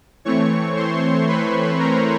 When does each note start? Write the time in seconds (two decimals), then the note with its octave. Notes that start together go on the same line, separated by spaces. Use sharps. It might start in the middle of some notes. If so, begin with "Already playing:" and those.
0.25 E3 A3 C4 C#5 C#6
0.76 C5 C6
1.27 B4 B5
1.79 A#4 A#5